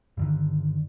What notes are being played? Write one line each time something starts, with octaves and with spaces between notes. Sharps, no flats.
G2 D3 D#3